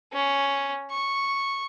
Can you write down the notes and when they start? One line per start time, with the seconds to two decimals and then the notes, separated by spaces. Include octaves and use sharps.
0.12 C#4
0.91 C#6